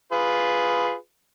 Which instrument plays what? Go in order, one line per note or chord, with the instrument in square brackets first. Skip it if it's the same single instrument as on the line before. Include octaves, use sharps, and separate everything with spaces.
[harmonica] F4 G#4 B4